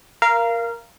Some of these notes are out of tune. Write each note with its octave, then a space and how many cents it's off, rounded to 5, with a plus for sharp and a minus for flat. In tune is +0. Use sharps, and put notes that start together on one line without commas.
A#4 +5 F5 -20